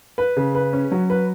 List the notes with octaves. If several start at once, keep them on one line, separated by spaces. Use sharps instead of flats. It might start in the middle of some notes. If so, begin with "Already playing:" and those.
B4
C#3
B4
C#4
F#3
B4